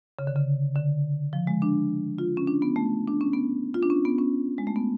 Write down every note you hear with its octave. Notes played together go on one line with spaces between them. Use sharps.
C#3
D3
C#3
D3
F3
G#3
D4
F4
C#4
D4
B3
A3
D4
C#4
B3
F4
D4
C#4
B3
C#4
G#3
A3
B3